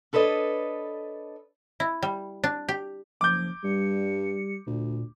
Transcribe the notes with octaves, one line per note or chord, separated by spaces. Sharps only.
D4 A4 B4 C#5 D#5
E4
G3
D4
G4
F#1 F3 D6 G6
G2 G3 C#7
D2 A#2